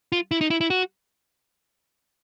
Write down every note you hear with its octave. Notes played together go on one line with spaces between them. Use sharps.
F4
E4
D#4
E4
E4
F#4